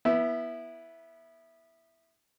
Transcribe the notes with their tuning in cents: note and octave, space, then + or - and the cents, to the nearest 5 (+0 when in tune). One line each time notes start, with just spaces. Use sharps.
B3 -20 E4 +0